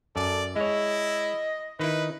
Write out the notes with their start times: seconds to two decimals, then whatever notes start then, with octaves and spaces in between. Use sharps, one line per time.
0.16 F#2 A4 D5
0.56 G#3 E4 C#5 D#5
1.79 D#3 D#4 E4 B4 D#5